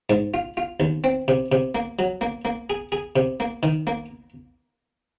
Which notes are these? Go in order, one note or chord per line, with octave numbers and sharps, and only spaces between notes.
G#2
F4
F4
D#2
C4
C3
C3
A#3
F#3
A#3
A#3
G#4
G#4
C3
A#3
D#3
A#3